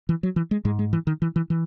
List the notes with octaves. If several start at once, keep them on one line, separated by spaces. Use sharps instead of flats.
E3
F#3
E3
G#3
G#2 G#3
G#3
E3
D#3
E3
E3
E3